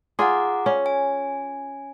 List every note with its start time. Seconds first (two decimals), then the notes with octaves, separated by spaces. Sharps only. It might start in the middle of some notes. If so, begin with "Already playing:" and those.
0.19 F4 G#4 F#5 A#5 D6
0.66 C#4
0.86 G#5